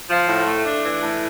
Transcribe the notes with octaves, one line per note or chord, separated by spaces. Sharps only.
F3
A2
A3
D4
E3
A2